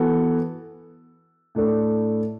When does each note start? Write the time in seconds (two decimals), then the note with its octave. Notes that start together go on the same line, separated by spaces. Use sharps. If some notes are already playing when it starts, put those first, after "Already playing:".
Already playing: E3 B3 F#4 A4
1.55 A2 A3 D4 A4